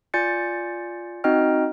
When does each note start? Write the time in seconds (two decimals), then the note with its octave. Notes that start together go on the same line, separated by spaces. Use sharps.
0.14 F4 D5 G#5 G6 A6 C#7
1.24 C4 D#4 F#4 D#5 G5 F6